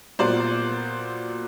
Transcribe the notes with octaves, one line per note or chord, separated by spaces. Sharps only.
A#2 F#3 B3 C5 D5